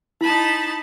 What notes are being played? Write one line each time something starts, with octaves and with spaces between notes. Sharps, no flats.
D#4 E4 A5 B5